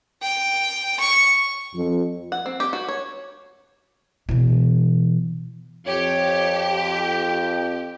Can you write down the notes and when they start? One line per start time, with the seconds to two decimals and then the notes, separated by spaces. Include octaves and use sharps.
0.22 G5
1.00 C#6
1.74 F2
2.32 F#5
2.46 C4
2.60 G4
2.73 F#4
2.89 C#5
4.29 B2 E3
5.87 F2 G4 C#5
6.94 G5